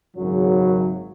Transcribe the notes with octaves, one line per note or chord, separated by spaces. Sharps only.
G#1 F#2 C#3 F#3